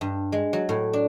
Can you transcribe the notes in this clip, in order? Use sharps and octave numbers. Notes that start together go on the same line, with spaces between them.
G2
G#3
F#3
A2
D4